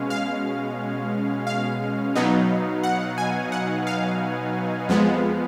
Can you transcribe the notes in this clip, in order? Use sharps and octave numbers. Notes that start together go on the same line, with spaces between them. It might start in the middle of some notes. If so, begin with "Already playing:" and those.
Already playing: B2 G#3 C#4 F5
F5
F5
B2 F#3 B3 D#4
F#5
G#5
F#5
F5
F2 F3 G#3 B3